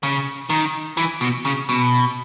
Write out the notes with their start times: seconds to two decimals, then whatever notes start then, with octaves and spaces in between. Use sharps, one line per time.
0.03 C#3
0.50 D#3
0.97 E3
1.21 B2
1.45 C#3
1.69 B2